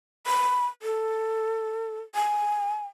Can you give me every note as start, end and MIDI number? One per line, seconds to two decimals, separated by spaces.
0.27 0.67 83
0.83 2.00 69
2.15 2.85 80